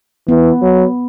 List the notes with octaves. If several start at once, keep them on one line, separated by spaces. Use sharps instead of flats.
E3 B3
F#3